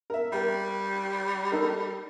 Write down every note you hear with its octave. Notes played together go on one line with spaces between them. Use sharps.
A#4 E5
G3 G4 A#4
D#4 A4 A#4